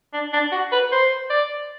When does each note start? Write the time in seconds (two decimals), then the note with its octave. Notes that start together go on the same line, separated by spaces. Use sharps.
0.13 D4
0.33 D4
0.52 F#4
0.72 B4
0.92 C5
1.30 D5